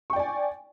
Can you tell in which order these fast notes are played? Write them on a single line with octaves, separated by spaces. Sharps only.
C#6 G5 D5 G#5